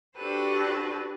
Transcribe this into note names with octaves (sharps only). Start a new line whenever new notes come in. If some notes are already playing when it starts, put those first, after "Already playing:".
D4 F#4 G4 A4 B4 C5